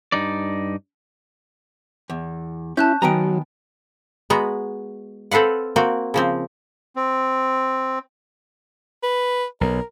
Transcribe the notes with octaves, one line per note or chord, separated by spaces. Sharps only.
G2 D#4 D5
E2
C#4 E4 A5 F#6 G6
D#3 F#3 B3 G#5 A#5 D7
G#3 B3 F#4 A#5
C4 A4 B4 F5 F#5
A#3 C4 F#4
C#3 F3 C4
C4
B4
B1 A#4